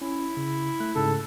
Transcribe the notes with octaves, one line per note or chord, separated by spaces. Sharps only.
C#4 E4
C#3
A3 F#6
G#2 C#3 A4